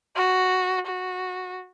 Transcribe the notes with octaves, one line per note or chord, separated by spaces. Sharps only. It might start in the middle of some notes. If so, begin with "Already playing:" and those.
F#4
F#4